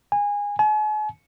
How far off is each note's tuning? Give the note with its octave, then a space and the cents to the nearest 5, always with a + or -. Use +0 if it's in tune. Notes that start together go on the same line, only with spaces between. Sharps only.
G#5 -20
G#5 +45